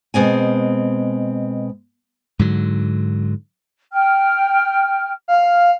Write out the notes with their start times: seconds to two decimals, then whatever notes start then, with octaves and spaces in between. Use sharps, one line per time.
0.14 B2 G#3 C4 G#5
2.39 G#2 D3 F#3
3.93 G5 F6
5.28 F5